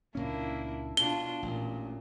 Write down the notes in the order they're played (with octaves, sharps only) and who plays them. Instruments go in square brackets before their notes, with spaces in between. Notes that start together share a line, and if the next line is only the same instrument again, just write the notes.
[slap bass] C#2 A#2 C#4 [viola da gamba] A#3 D4 E4
[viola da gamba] B2 D4 F4 [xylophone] G7
[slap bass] A1 [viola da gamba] A#2